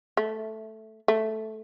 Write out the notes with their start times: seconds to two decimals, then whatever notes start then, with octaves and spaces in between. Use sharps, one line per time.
0.17 A3
1.08 A3